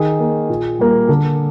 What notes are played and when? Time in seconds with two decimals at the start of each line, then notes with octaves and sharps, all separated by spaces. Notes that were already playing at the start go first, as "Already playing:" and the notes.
Already playing: D#3 G#4
0.20 A#3
0.49 A#2
0.79 G3 A#3
1.09 D3